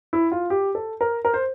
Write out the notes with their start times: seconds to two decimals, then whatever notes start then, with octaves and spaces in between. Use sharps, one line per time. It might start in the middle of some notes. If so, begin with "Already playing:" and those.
0.13 E4
0.32 F4
0.50 G4
0.75 A4
1.01 A#4
1.25 A#4
1.34 C5